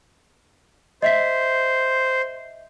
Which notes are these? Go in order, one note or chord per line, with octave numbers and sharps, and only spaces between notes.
C5 D#5 E5 B6